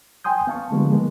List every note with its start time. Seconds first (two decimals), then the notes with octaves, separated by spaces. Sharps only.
0.24 G5 G#5 C6 D#6 G6
0.47 B3 F5 A5 C#6
0.71 D3 F3 G3 G#3 A#3 B3
0.91 D#3 G#3 A#3 B3